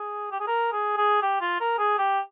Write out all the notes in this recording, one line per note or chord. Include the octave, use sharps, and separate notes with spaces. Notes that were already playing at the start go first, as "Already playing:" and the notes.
Already playing: G#4
G4
G#4
A#4
G#4
G#4
G4
F4
A#4
G#4
G4